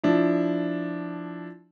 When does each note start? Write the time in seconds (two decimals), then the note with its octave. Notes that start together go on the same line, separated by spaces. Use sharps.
0.04 F3 D4 E4